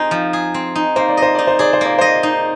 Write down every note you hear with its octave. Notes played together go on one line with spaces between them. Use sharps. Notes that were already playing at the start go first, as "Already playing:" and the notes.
Already playing: C4 D#4 G#4 G#5
F3
G#4
C4
D#4
A#3 C5
D5
C5 D#5
D#4 D5
C5
G#4 D5
C5
A#3 D5
C5 D#5
D#4